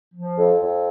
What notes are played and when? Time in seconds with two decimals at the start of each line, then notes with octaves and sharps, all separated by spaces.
0.14 F3
0.37 F2
0.61 F2